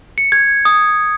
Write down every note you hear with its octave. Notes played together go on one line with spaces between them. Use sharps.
C#7
G#6
D#6